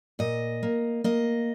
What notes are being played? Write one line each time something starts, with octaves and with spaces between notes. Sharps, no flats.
A#2 D#5
A#3
A#3 D#5